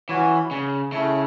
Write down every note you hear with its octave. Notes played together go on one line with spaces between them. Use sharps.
E3 C#4 F#4 C#5
C#3
C#3 A3 E4 A4